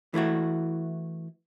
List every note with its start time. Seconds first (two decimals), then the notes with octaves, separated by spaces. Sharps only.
0.14 E3 A3 E4 F#4